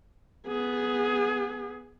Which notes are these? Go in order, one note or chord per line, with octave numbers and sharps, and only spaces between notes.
B3 G#4